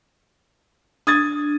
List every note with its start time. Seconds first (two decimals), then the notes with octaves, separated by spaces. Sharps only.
1.07 D4 D#6 G#6 A6